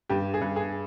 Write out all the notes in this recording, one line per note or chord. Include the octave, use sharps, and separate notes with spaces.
G2 G4
G#4
G2
G#4